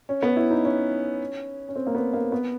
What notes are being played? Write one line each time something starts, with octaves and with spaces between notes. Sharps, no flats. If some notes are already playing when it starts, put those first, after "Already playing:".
C#4
B3
E4
D#4
C#4
C#4
C4
A#3
B3
A#3
B3